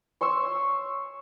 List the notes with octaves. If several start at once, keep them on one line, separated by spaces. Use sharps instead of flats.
C#5 C6 C#6 E6